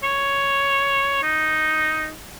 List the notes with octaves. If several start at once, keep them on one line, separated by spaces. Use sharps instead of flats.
C#5
D#4